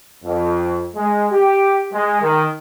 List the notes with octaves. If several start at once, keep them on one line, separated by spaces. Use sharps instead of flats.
F2
G#3
G4
G#3
D#3